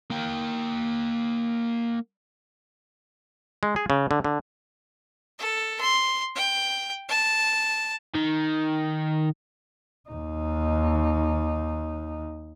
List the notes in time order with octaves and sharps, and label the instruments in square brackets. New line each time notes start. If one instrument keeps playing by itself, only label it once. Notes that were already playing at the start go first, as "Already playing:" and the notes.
[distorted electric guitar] A#3 G5
[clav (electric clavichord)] G#3
G#4
C#3
D3
D3
[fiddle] A4
C6
G5
A5
[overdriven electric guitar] D#3
[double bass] D#2 D#4